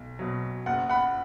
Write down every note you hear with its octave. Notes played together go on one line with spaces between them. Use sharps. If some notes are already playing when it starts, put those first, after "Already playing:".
Already playing: B1
B2 F#3
F#1 F#5
F#5 B5